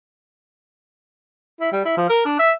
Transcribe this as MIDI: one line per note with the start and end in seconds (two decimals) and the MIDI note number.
1.61 1.71 64
1.72 1.84 55
1.85 1.95 64
1.97 2.07 53
2.09 2.22 70
2.25 2.34 62
2.39 2.51 76